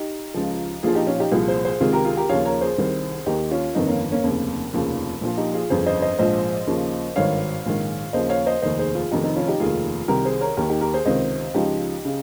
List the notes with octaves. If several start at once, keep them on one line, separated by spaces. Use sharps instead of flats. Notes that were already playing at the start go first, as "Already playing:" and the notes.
Already playing: D#4 G4
C#2 C#3 F3
A#1 A#2 F3 F4 G#4
D#4 G4
C#4 F4
D#4 G4
C2 A#2 F3 F4 G#4
G#4 C5
G#4 C5
C#2 C3 D#3 F4 G#4
G4 A#4
F4 G#4
G4 A#4
D#2 C#3 F3 C#5 F5
A#4 C#5
G#4 C5
C2 C3 D#3
D#2 D#3 D#4 G4
C#4 F4
G1 F2 D#3 C4 D#4
A#3 C#4
A#3 C#4
F1 D#2 C#3 C4
F1 D#2 C#3 F3
A#1 A#2 F3
D#4 G4
F4 G#4
G1 F2 C#3 G#4 C5
C5 D#5
C5 D#5
A#1 G#2 F3 C5 D#5
D#2 C#3 F3
G#1 G2 D#3 C#5 F5
A#1 G#2 D#3
D#2 C#3 F3 C5 D#5
C#5 F5
C5 D#5
F1 D#2 D#3 C5 D#5
G#4 C5
F4 G#4
F1 F2 D#3 D#4 G4
C4 D#4
C#4 F4
D#4 G4
F1 D#2 D#3 F4 G#4
C2 C3 D#3 G4 A#4
G#4 C5
A#4 C#5
D#2 D#3 G4 A#4
D#4 G4
G4 A#4
G#4 C5
C#2 C3 D#3 C5 D#5
C#2 C#3 F3 D#4 G4
C#3